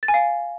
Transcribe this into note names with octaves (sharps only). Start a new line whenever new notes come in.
A6
G#5
F5